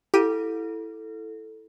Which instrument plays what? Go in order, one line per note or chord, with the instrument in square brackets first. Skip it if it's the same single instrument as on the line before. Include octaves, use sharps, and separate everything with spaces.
[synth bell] E4 A4 [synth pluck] G4 D#7